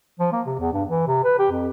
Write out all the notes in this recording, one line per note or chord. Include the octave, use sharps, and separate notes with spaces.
F3
A#3
C3
E2
G2
E3
C3
B4
G4
F2